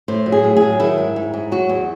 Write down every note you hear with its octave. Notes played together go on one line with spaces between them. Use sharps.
A2 C5
F#3
G#4
A2
G#4
F#3
D#3 E4
G#2
G#2
G#2
F#3 F#4
E2